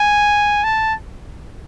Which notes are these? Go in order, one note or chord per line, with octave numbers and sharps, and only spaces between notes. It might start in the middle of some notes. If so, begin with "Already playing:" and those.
Already playing: G#5
A5